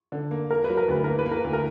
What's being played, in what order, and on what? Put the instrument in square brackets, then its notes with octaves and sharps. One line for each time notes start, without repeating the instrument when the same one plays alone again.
[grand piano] D3
A#3
[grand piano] A#3 [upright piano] A#4
[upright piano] B4
[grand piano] F#3
[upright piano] A#4
[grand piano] D2 [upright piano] B4
[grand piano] A#3 [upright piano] A#4
[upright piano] B4
[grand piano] A#3
[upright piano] A#4
[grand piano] D2
[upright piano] A#4